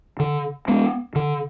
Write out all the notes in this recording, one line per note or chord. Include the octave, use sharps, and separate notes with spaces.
D3
G#3 B3
D3